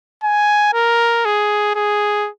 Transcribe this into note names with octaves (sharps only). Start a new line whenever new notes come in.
G#5
A#4
G#4
G#4